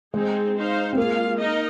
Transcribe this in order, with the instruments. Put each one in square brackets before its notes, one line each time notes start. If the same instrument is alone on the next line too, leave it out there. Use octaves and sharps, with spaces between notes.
[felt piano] G#3 [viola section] C4 D#4 G#4
[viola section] D#4 C5 F5
[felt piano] C4
[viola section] G#3 F4 G#4 F5 [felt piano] A#3
[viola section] D#4 A#4 D#5